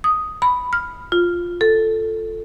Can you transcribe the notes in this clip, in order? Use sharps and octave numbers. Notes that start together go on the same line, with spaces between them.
D#6
B5
F6
F4
A4